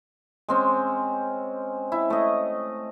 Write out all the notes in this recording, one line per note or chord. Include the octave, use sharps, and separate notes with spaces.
G#3 C4 C#4
E4
A3 D#5